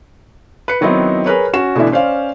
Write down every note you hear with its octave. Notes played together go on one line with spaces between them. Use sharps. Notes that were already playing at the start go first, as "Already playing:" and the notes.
B4 C#7
D#3 F#3 B3 C4 D#4 E4
G#4 A#4 B4 C#5
C#4 F#4 E7
B2 D3 E3 A3 D4 E4
C#4 C5 D5 F5